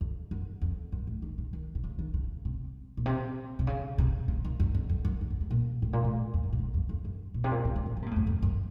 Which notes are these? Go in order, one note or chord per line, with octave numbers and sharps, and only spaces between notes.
F2
F#2
F2
F#2
A2
D#3
C#3
D#3
C3
C#3
D#3
C#3
C3
A#2
C3
C3
C#3
C3
C#3
D#3
F#2
F2
F#2
F#2
F#2
F2
F#2
A#2
A2
A#2
A2
F2
F#2
A2
F#2
F2
F2
F#2
A#2
C3
A#2
A2
F#2
A2
F3
C3
A#2
A2
F#2
F2
F#2